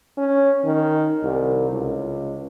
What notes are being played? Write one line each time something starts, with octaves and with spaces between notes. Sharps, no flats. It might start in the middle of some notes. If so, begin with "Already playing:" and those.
C#4
D#3
C2
C#2